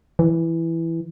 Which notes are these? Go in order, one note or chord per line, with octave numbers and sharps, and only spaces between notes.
E3